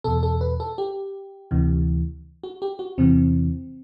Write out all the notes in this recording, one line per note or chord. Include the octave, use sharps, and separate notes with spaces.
E2 B2 A4
A4
B4
A4
G4
D2 C3 E3
F#4
G4
F#4
E2 C3 E3 C4